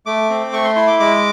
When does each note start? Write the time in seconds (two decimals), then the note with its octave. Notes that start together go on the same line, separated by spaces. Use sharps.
0.06 A3 D6
0.30 C4
0.52 A3 C#6
0.64 C6
0.76 E4 C6
0.87 D6
1.00 G#3 D6